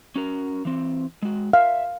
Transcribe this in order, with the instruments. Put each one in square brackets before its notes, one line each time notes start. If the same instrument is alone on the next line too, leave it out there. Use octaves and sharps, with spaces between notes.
[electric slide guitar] C#4 F#4 A#4
E3 C4
G#3 F#4
[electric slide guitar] E5 [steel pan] F5